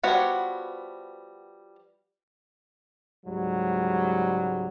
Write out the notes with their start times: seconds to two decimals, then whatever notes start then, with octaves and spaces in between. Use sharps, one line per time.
0.03 F3 G3 B3 F#4 C#5
3.26 C#2 G#2 F#3 G3